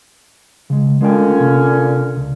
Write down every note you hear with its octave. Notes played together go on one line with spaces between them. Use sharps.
C#3 G#3
A#2 D3 G#3 A3 C#4 G5
C3 A#3
C#2